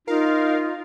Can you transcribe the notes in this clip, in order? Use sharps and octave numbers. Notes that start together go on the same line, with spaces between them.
D#4 F4 A#4 F5